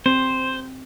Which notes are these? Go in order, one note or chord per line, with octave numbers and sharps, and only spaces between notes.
C4 C5